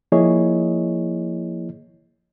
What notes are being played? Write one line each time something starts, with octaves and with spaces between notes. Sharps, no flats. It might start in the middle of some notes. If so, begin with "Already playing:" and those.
F3 A#3 E4 G#4 C#5 D#5